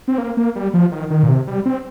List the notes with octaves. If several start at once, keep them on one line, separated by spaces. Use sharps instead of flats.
C4
A#3
A#3
G3
F3
D#3
D#3
A#2
C3
G3
C4